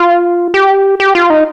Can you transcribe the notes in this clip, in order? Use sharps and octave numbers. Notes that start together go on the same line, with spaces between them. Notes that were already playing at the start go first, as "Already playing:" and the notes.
Already playing: F4
G4
G4
F4
D#4